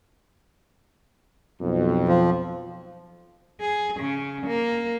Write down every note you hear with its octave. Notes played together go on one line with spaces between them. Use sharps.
B1 F2
F3
G#4
C#3
A#3